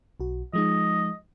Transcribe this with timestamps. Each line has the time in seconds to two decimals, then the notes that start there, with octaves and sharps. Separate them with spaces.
0.20 B1 F#4
0.53 F3 G#3 D#4 D#5